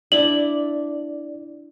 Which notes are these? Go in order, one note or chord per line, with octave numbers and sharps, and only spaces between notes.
D4 E4 D5 F#7